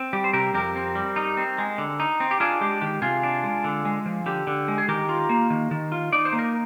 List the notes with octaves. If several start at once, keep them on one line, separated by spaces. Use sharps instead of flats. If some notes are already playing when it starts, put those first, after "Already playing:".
Already playing: C4
G3 G4
C5
C3 G4 A#4
F2 G4 A#4
C4
G3
D#4
C4
G#3
D3
D#4
C4
G4
D4 F4 G#4
G#3 G4
D#3 G4
C3 F4 G#4
D4
G#3
D3
G#3
F3
D3 G4
D3
G#3
G#4
D#3 G4 A#4
F4
A#3
D#3
D#3
F4
D#4 D5
C5
A#3
A#4